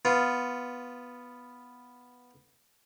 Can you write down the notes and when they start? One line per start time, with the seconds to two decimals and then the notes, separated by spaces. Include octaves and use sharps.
0.05 B3 F4